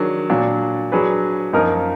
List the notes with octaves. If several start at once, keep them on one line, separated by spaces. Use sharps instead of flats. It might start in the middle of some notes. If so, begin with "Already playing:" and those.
Already playing: D#3 F#3 D4 G#4
A#2 F#3 D4
F#3 D4 G#4 B4
F#2 F3 A#3 D#4 A#4